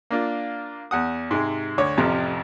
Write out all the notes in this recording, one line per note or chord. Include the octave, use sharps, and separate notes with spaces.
A#3 D4 F4
E2 F#5 D#6
G#2 C3 G#3
D2 C#5 D6
A1 F2 C3 F3 G4 A#5